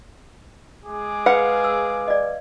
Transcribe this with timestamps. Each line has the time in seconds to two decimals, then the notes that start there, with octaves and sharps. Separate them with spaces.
0.85 G#3 G#4 D6
1.26 B4 F5 F#5
1.64 E6
2.08 D5 D#5